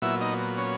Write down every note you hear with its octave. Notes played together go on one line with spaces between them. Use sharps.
A#2 F#3 B3 E4 E5
D#4 D#5
C#4 C#5